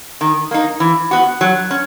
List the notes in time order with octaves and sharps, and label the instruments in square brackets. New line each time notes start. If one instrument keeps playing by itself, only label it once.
[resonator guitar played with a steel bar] D#3
A#3 D#4
E3
B3 F#4
F#3
C#4